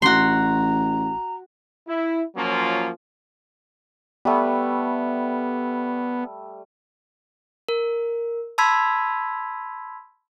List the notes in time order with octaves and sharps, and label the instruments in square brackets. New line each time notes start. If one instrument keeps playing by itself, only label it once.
[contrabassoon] A1 [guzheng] F#4 C6 [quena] A#5
[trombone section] E4
F3 F#3 A#3 C#4 F4
[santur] G3 A3 [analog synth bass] B3
[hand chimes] A#4
A5 B5 C6 E6 G#6 B6